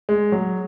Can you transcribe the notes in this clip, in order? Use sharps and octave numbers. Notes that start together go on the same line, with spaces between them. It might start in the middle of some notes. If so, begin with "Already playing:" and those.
G#3
F#3